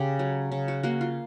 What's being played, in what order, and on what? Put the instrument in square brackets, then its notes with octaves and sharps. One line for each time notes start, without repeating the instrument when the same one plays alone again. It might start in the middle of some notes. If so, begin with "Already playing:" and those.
Already playing: [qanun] C#3 G4
F#3
C#3
F#4
A#3 F#4
F4